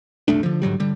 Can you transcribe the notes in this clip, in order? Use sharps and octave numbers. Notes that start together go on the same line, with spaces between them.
F#1 C2 A3 D4
D3 F3
G#2 D3 F#3 G3
D3 G3